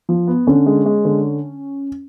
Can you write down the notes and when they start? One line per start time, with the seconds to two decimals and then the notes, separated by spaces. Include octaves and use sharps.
0.09 F3
0.27 B3
0.47 D3 C#4
0.66 G#3
0.86 G#3
1.05 D3